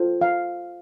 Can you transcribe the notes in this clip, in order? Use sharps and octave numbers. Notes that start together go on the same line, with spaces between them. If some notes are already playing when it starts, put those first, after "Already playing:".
Already playing: F4 A4 C5
F5